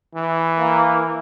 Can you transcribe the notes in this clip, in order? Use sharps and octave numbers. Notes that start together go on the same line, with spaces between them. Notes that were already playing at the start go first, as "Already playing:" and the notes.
E3
A#3